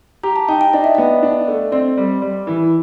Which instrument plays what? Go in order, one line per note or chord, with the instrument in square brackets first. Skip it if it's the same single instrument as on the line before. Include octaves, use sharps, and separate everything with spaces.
[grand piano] G4 [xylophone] A#5
[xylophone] A5
[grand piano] D#4 [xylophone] G5
[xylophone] G5
[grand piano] D4 [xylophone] D#5
[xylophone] E5
[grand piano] B3 [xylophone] D#5
[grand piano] D4
A3
[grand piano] C4 [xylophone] D5
[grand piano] G3
G3
E3